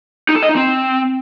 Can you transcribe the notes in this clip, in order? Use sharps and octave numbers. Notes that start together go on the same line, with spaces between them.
D#4
A4
D#5
D#4
C4